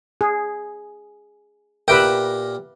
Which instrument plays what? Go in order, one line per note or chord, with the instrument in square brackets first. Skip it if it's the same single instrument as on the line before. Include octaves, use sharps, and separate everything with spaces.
[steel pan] G#4
[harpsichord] A#2 G4 A#4 [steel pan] B4 E5 G5